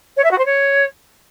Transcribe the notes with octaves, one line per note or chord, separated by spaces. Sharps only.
C#5
E5
F#4
C5
C#5